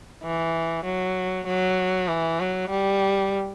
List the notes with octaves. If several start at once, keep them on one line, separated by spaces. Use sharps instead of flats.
E3
F#3
F#3
E3
F#3
G3